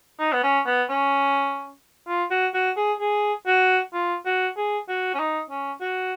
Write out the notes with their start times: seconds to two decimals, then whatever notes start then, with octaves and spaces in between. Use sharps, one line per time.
0.19 D#4
0.33 B3
0.43 C#4
0.66 B3
0.89 C#4
2.08 F4
2.30 F#4
2.54 F#4
2.77 G#4
3.00 G#4
3.47 F#4
3.93 F4
4.26 F#4
4.57 G#4
4.88 F#4
5.14 C#4
5.19 D#4
5.50 C#4
5.81 F#4